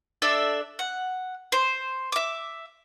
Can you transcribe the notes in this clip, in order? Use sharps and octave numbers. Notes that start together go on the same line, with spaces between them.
D4 A4 D5 E5
F#5
C5
E5 D6